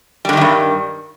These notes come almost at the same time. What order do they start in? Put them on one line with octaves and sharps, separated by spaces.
G3 D3 D#3 E2 G2